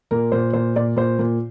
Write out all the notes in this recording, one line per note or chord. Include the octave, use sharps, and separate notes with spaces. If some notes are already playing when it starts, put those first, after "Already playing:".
A#2 A#4
A#2 C5
A#2 C5
A#2 D5
A#2 C5
A#2